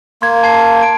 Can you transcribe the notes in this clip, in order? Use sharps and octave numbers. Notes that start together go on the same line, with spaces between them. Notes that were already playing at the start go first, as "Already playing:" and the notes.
A#3 C6 G#6
A5 G#6 C7
D7